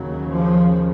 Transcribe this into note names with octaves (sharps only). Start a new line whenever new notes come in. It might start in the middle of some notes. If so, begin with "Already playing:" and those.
Already playing: D#2 C#3 F#3
F3